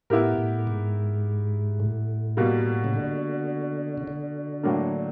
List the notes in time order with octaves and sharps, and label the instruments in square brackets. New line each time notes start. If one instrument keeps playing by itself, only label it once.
[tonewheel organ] A2 [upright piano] B3 E4 G4 A#4
[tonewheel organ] A2
G#2
A2
[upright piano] B2 G3 A#3
[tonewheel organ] C#3
D3
C#3
D3
[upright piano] A2 F#3 A#3 D4